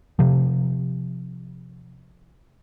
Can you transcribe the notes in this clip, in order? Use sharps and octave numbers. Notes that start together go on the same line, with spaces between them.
C3 F3